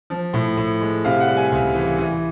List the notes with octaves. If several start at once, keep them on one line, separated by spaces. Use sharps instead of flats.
F3
A2
A2
G#3
C3 F5
F#5
G3
G#5
C#2
E3
E3